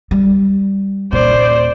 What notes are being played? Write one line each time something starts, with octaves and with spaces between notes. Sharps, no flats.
G3
D#1 A#2 C5 D5